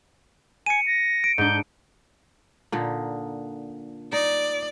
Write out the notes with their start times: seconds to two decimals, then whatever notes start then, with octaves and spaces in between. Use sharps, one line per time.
0.66 G#5 C#7 D#7
0.87 A#6
1.24 D7
1.38 G#2 D4 G6
2.72 A#2 D3 D#4
4.13 D#4 D5